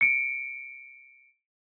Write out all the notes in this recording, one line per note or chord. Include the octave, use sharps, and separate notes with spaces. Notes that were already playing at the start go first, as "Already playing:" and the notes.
C#7 D7